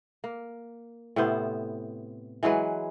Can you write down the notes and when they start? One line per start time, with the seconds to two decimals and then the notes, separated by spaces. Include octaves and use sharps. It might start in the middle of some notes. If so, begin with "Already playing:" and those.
0.24 A#3
1.16 A2 C3 B3 C5
2.43 E3 F#3 G#3 B4